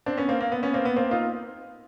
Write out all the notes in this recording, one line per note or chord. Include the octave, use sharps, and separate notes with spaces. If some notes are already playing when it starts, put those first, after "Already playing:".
C4 D4
B3 C#4
A#3 C4
A#3
B3
B3 C#4
A#3 C4
B3
A#3 C4
D#4 F4